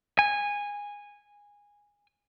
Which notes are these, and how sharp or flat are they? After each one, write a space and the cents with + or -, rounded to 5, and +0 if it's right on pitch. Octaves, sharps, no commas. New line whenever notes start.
G#5 -15